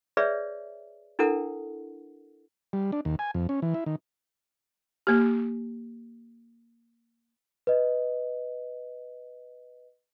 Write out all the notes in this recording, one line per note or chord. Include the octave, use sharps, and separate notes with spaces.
G#4 B4 C#5 D5 E5
D4 E4 A4 A#4 F#5
G3
D4
D#2
G#5
F2
C#4
E3
E4
D#3
A#3 G4
B4 D#5